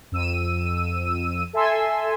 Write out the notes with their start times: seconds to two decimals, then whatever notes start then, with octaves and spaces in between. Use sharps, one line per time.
0.12 F2 E6 D#7
1.53 A4 E5 G#5 C6 E6